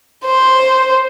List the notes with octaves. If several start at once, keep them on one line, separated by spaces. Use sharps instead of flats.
C5